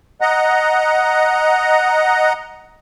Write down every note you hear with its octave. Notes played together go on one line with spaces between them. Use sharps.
D#5 F#5 A#5